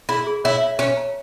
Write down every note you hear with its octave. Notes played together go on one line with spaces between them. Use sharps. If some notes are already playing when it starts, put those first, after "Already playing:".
E4 G#4
G#4
E4 C#5
E5
C#4 C#5
A#5